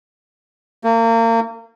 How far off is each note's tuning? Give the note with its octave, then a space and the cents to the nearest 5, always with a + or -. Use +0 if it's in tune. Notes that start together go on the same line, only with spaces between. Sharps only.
A#3 -35